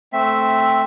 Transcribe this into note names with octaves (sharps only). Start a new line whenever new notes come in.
A3 C4 E5